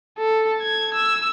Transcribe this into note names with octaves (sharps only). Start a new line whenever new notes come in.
A4
G#6
E6